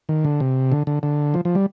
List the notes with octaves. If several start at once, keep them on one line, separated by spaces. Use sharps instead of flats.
D#3
D3
C3
D3
D3
D3
F3
F3
G3